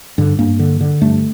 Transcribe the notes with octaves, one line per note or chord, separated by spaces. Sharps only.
G2 D3
G2 A#3
D3
D3
G2 A3